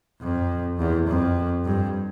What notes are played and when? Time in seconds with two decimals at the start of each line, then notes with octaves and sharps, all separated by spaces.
0.21 F2
0.79 E2
1.08 F2
1.66 G2